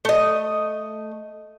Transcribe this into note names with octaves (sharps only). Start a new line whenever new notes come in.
A3 D#5